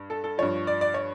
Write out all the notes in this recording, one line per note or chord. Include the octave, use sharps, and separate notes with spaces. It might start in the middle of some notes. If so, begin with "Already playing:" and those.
Already playing: G2
A4
A4
G2 F3 C#5
D5
D5
C#5